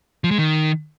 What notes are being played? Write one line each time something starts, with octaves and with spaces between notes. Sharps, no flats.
F3
G#3
D#3